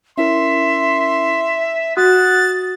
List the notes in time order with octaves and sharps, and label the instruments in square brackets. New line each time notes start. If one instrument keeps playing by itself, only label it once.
[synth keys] C#4 E4 A#4 [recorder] E5 [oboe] C6
[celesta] F#4 [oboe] F#5 [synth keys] D#6 [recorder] A6